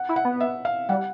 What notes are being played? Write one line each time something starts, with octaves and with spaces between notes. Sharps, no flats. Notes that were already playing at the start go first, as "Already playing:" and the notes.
Already playing: F#5
E4
F#5
B3
E5
F5
G3 F#5